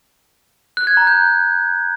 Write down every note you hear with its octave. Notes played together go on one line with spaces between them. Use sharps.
F#6
G#6
A#5
G6